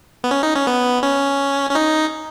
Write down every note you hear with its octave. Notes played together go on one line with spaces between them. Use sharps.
B3
C#4
D#4
C#4
B3
C#4
C#4
D#4